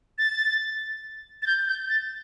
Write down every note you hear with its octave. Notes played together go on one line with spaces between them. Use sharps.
A6
A6
G6
G6
A6